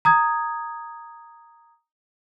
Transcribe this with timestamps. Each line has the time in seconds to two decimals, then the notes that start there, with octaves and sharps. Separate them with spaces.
0.05 A#5 D#6 G#6